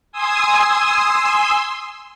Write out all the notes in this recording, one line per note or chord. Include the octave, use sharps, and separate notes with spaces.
G#5 C6 D#6 E6